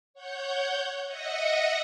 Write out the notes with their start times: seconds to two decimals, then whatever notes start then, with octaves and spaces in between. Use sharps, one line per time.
0.14 C#5 F#5 G6
1.06 D#5 E5 F#5 D#6 A#6 C#7